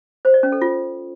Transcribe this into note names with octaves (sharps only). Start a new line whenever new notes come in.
C5
D5
C#4
A4
F4